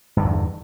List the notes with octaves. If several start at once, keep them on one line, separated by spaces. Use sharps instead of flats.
E2 G2 D3 D#3